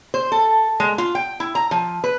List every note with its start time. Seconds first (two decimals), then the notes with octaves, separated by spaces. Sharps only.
0.14 C5
0.32 A4
0.80 G#3
0.98 F4
1.15 G5
1.40 E4
1.55 A#5
1.71 F3
2.04 B4